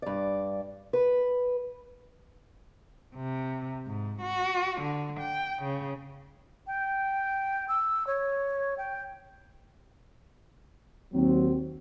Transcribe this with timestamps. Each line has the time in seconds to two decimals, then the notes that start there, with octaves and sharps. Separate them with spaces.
0.02 G2 D5
0.93 B4
3.16 C3
3.87 G#2
4.22 F#4
4.82 D3
5.21 G5
5.63 C#3
6.67 G5
7.68 E6
8.07 C#5
8.77 G5
11.13 D#2 F#3 C4